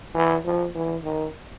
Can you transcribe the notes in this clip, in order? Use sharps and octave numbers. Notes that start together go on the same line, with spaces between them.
E3
F3
E3
D#3